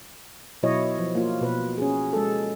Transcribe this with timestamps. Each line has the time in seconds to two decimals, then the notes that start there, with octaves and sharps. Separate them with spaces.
0.63 B2 F#3 E4 C#5 D#5
0.99 F3
1.15 A#3 F4
1.41 B2 B4
1.78 C#4 G#4
2.13 G#3 A4